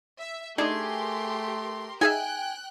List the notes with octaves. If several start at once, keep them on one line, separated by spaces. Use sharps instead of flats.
E5
A3 D4 D#4 G4 G#4 A#4 C6
D#4 G#4 E5 G5 G#5 F#6